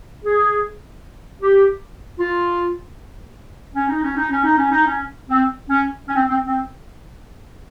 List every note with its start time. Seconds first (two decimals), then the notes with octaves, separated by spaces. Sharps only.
0.24 G#4
1.41 G4
2.19 F4
3.74 C#4
3.89 D#4
4.02 C#4
4.16 D#4
4.30 C#4
4.44 D#4
4.58 C#4
4.71 D#4
4.86 C#4
5.30 C4
5.70 C#4
6.08 C#4
6.15 C4
6.29 C4
6.46 C4